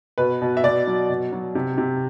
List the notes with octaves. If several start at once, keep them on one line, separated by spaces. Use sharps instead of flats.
B2 B4
B2
E5
B2 D5
F#3
B2
F#3
C3
C3